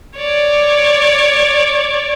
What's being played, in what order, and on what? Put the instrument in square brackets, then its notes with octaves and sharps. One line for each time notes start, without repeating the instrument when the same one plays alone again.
[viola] C#5 D5